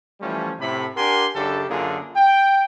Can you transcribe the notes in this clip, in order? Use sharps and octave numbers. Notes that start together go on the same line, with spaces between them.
E3 F3 G3 A3 C#4
A2 C3 B5
D4 G4 A#4 F#5 G#5 C6
F#2 C#3 D4 G4 A4
F#2 D3 A#3 F4 G#4
G5